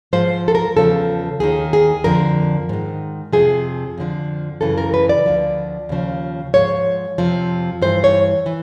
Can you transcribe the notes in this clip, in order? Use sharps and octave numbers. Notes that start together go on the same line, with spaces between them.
G#2 F3 C5
A4
A#4
E2 C#3 F3 A4
D#2 D#3 G#4
G#4
F2 D3 F3 A#4
G#2 D#3
F2 C3 F3 G#4
F2 D3 F3
F#2 C#3 E3 A4
A#4
B4
D5
D2 D3 F3
D#2 C#3 F3
G#2 F3 C#5
F2 C3 F3
G2 E3 C5
C#5
E3